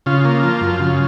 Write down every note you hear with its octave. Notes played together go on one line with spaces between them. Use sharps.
C#3 F4
A#3
F3
F#2
C#3